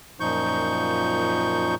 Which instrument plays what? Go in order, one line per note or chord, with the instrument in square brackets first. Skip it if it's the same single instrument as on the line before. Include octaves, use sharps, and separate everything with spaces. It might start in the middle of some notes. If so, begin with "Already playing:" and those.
[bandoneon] F#2 A#2 F3 D#4 C#6 G6